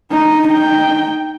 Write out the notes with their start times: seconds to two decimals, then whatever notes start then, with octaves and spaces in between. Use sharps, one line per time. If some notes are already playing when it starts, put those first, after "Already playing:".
0.11 D#4
0.48 D#4 G5